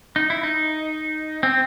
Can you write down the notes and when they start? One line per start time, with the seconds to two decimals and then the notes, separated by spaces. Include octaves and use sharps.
0.16 D#4
0.30 E4
0.43 D#4
1.43 C4